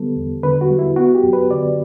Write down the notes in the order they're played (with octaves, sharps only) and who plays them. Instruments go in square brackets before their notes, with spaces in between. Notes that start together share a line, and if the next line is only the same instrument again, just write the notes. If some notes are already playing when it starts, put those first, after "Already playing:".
Already playing: [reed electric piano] D3 G3 B3 A4
E2
D3 B4
F#4
G3
E4
B3 F#4
G4
F#2
B4
D3 D5